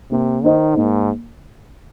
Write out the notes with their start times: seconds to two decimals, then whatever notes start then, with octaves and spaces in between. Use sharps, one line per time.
0.11 C3 A#3
0.44 D#3 D#4 C5 D#5
0.76 G#2 A#3